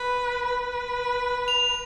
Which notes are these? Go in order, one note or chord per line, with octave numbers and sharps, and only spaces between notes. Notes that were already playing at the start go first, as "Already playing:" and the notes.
Already playing: B4
B4
F7